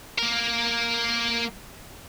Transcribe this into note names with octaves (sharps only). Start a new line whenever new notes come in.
A#3 A#4